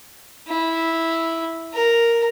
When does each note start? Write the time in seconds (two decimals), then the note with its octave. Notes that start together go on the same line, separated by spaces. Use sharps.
0.48 E4
1.73 A#4